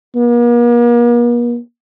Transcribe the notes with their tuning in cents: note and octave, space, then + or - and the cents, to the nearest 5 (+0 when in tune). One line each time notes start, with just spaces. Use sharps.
A#3 +45